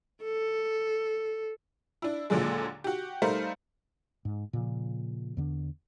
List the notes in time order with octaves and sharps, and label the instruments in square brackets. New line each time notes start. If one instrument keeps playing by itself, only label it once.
[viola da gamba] A4
[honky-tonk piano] D4 E4
D#2 A#2 D3 F#3 G#3
F#4 G4
G3 A3 D#4 A#4 C5 F5
[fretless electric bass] G#2
A#2 C#3 F3
E2 D3 D4